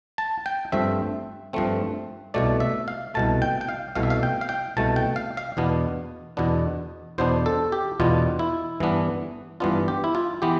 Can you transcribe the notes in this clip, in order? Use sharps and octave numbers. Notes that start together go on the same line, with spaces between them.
A5
G5
G2 F3 A3 C4 E5
G2 F3 A3 C4
C2 B2 A3 D5
E5
F5
C2 B2 A3 A5
G5
G5
F5
C2 B2 A3 F5
E5
F5
G5
F5
G5
C2 B2 A3 A5
G5
F5
F5
E2 B2 B3 D4
E2 B2 B3 D4
E2 B2 B3 D4 C5
A4
G4
E2 B2 B3 D4 F4
E4
G2 E3 B3 D4
G2 E3 B3 D4 F4
G4
E4
F4
E3 B3 G4